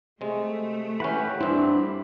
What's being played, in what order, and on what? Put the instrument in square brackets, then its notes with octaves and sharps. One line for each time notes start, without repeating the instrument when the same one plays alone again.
[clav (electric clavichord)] C3 G#3 [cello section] A3
[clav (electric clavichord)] E3 C#4 [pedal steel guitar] G4 F#5 B5
[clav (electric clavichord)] G2 C4 [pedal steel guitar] D4 E4
[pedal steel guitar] B5